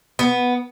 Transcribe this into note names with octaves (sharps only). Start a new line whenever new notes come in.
B3